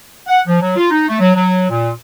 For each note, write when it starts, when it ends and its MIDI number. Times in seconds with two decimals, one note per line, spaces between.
0.27 0.41 78
0.47 0.61 53
0.61 0.75 54
0.77 0.88 65
0.91 1.05 63
1.09 1.17 57
1.20 1.33 54
1.35 1.68 54
1.70 1.90 46